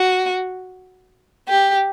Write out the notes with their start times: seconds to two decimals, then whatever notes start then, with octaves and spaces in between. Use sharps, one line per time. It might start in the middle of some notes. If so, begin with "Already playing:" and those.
Already playing: F#4
1.48 G4